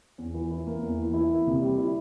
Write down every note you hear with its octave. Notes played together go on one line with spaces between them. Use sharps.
E2
E3
E4
A#3
E2
E3
E4
A#3
C3
G3
E4